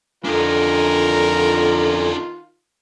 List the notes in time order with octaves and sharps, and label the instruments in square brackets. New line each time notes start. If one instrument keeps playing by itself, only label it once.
[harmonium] F2 D3 G#5 [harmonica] D#3 F4 [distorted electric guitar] D4 D#4 [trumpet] A#4